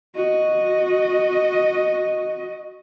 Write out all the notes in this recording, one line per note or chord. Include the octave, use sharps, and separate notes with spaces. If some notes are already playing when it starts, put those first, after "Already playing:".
F#4 D#5